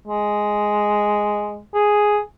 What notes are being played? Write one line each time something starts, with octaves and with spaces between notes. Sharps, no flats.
G#3
G#4